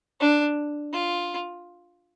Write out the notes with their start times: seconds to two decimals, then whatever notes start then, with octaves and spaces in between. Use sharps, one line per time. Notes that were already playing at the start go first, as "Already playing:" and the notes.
0.20 D4
0.93 F4